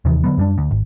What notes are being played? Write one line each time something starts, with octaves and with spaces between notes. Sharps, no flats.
D#2 C3 D#3 E3
D3 F#3 B3
F#2 G3 D4
D2
G#1